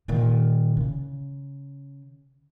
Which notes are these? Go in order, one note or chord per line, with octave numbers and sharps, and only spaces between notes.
A#2 D#3
C#3